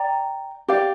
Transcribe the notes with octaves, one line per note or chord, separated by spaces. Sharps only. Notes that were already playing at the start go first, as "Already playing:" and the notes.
Already playing: D5 G5 A#5
G4 D5 F5